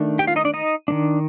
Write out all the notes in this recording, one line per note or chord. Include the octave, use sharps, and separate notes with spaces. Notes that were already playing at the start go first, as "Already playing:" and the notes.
Already playing: D#3 A3 D4
G4 G5
F4 F5
D#4 D#5
D4 D5
D#4 D#5
D#3 A#3 D4